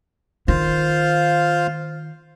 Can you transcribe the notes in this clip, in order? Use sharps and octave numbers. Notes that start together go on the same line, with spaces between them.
D#3 F4 C5 F5